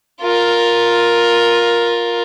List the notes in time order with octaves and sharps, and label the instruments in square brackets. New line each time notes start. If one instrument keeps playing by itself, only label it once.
[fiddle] F4 A#4